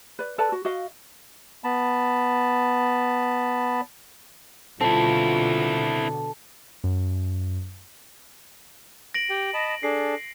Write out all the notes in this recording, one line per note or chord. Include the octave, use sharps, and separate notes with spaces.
B4 D5
A4 B4 D5 A5
F#4
F#4 D#5 F5
B3 A5 B5
B2 D3 C4 E4 F4 A4
F#2
A#6 D7 F#7
G4 G5
D#5 A5 B5
D4 G#4 A4 C7